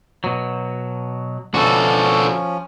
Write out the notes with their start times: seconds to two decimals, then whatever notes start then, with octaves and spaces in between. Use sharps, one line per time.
0.24 B2 F#3
1.54 B2 D3 F3 C#4 F#4 A4